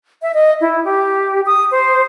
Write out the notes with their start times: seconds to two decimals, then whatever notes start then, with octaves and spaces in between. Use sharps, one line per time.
0.21 E5
0.34 D#5
0.61 E4
0.85 G4
1.45 D#6
1.72 C5